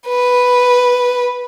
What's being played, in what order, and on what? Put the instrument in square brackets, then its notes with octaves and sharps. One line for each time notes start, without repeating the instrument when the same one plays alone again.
[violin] B4